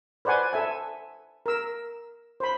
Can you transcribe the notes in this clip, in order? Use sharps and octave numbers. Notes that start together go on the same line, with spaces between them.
B4 C5 D5 F#5 G#5
A4 E5 G#5
A#4 E6
C5 B5